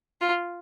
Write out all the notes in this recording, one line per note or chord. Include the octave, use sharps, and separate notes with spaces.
F4